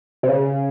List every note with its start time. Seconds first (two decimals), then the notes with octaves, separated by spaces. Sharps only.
0.23 C3
0.29 C#3